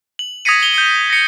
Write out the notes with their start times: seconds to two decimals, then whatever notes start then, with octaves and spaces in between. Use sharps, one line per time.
0.19 F#7
0.45 D#6 G#6 A#6 B6 C#7 D#7
0.63 G7
0.74 G6 C#7
1.10 A#6 C#7